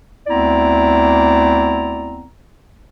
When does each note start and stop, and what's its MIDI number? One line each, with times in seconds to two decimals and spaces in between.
0.27 2.24 38
0.27 2.24 59
0.27 2.24 60
0.27 2.24 64
0.27 2.24 74
0.27 2.24 82